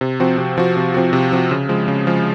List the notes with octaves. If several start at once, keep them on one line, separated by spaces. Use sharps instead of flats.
C3
F3 C4 F#4
C3
F3 C4 F#4
C3
F3 C4 F#4
C3
F3 C4 F#4
C#3
F3 G#3
C#3
F3 G#3